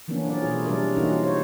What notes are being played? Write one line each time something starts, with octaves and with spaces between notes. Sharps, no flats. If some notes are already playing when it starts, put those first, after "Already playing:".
E3 F3 A#3 B3 C#4 D4
F#3 C#4 A#4 D5
B2 A3 E4 F4 G#4
C3 F#3 G3 D4 A#4 D5
E3 A#3 C#4 D#4 F4 F#4
C5 C#5